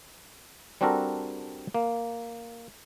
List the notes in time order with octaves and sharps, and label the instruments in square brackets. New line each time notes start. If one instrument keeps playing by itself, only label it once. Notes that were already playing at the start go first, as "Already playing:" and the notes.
[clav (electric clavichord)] G3 C4 D4 F#4 A4 A#4
A#3